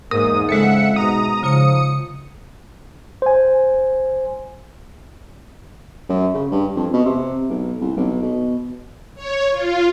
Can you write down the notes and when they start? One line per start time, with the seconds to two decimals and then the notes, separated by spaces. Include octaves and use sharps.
0.11 E2 G#2 A#3 A#4 D#6
0.49 F2 C#3 G#3 A4 E5 F#5 C#7
0.96 G#2 B2 A#5 D#6
1.43 G#2 C#3 F3 F4 C#7
3.22 C5 G#5
6.09 F#2
6.34 C#3
6.51 G2
6.76 F2
6.93 B2
7.05 C3
7.50 B1
7.81 C2
7.97 B1
8.22 B2
9.15 C#5
9.51 F4